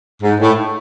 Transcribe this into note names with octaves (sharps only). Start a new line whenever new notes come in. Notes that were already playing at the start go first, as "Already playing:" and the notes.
G#2
A2